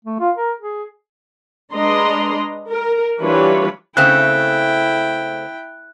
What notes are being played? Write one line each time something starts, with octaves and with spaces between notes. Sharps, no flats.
A3
F4
A#4
G#4
G#3 D4 B4 D#5 A#5 C6
A#4
E3 G3 D4 F4 B4 C#5
C#3 A3 C4 E4 G5 F#6